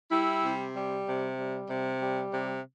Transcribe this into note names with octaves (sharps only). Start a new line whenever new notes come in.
G3 E4
C3
G3
C3
G3
C3
G3
C3